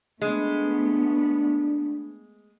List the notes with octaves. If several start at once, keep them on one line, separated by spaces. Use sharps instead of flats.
G#3 A3 B3 D4